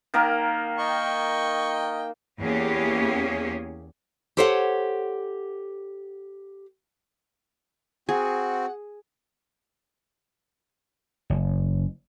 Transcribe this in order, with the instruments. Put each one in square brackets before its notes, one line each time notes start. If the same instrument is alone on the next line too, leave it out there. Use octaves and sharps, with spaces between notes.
[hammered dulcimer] D#3 A#3 A#4
[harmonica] D#5 G5 C#6
[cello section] E2 A#3 C#4 G4 G#4 C#5
[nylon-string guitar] G4 A4 C5 C#5 F5 F#5
[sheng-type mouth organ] C4 F#4 [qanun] G#4 [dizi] F#5
[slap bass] F#1